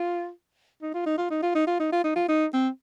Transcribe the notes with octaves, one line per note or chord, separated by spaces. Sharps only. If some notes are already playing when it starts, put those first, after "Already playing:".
Already playing: F4
D#4
F4
D#4
F4
D#4
F4
D#4
F4
D#4
F4
D#4
F4
D#4
C4